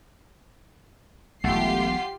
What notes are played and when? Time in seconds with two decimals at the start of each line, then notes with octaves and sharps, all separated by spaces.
1.44 E1 B1 A3 F4 G4 F#5 C7